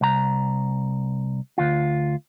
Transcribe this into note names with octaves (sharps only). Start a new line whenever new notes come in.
C2 A#5
D2 F4